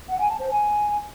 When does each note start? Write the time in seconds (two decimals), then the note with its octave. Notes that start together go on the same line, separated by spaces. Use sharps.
0.09 F#5
0.19 G#5
0.29 A5
0.39 C5
0.50 G#5